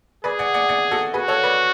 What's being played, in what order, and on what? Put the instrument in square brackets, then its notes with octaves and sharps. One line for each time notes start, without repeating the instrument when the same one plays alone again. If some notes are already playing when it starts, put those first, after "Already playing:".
[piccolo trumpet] G#4 [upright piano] B4 D5
[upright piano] D5 F#5
D5 F#5
D5 F#5
F#4 A4
[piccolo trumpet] F#4 [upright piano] G#4 B4
[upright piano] A4 C#5
B4 D5